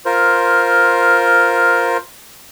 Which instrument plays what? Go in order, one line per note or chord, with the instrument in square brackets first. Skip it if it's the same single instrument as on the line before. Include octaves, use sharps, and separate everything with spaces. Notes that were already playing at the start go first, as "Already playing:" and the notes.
[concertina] F4 A#4 C5